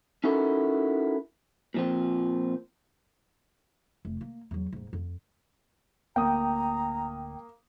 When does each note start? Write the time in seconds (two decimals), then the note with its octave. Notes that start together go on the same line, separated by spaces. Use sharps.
0.24 C#4 D#4 E4 F#4 A4 A#4
1.74 A#2 F3 C4
4.05 F1
4.21 A#3
4.51 E2 F#3
4.73 D#1 G#2
4.93 F2
6.16 D1 D2 A#3 G5 A#5 D#6